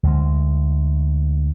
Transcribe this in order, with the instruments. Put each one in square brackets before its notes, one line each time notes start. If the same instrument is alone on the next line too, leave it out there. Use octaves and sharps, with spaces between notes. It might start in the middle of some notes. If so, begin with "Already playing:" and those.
[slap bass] D2 G#3